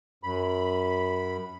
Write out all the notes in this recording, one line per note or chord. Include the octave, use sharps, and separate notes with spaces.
F#2 B5